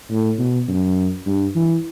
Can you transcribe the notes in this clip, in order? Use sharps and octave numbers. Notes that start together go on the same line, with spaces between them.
A2
B2
F#2
G2
E3